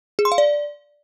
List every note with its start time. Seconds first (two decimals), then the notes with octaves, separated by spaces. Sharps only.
0.19 G#4
0.25 C6
0.32 F5
0.38 D5